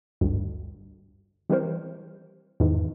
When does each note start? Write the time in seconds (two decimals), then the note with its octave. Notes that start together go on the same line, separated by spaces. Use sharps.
0.21 G#1 D2 G2
1.50 E3 G3 C4 A#4 C5
2.60 E2 G#2 D#3 E3